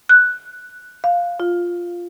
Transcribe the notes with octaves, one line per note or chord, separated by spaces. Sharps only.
F#6
F5
F4